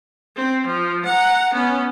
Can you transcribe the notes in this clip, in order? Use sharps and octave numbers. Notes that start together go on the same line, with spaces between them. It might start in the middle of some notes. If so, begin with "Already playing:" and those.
C4
F3
F#5 A#5
B3 C#4